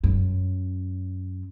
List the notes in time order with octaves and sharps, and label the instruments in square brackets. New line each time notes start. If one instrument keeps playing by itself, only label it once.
[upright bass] F#2